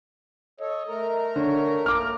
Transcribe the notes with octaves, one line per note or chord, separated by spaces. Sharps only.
A4 C#5 D#5
A3 A#4 A#5
D3 C#5
A#3 D6 F6